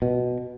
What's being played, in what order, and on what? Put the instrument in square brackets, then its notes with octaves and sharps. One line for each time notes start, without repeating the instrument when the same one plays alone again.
[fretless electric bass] B2